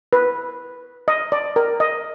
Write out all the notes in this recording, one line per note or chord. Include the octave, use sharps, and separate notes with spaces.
B4
D#5
D5
A#4
D#5